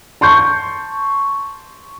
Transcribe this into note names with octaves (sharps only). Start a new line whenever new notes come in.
A5 C6 C#6 G6